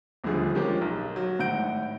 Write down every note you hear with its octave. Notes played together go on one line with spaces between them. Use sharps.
D#1 D2 D3 F3 G#4
F3 G#3 A#3 C#4 G4
B1
F#3
G#1 A2 F#5 G6 D7